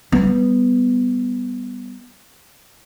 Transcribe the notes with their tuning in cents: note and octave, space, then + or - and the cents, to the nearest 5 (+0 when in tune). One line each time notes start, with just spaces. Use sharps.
G3 +0 B3 +0